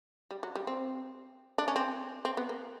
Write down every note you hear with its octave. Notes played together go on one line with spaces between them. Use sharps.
G3
F#3
G3
C4
D4
C#4
C4
C4
B3
A#3